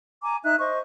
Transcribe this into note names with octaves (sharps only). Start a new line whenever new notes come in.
G#5 A#5 D6
D#4 E5 F#6
C5 D#5 C#6